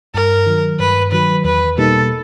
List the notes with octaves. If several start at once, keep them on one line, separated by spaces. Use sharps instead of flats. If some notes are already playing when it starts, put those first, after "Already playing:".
G2 A#4
D#3 F#3
G2 B4
D#3 F#3 B4
E2 B4
B2 G3 A#3 D#4 A4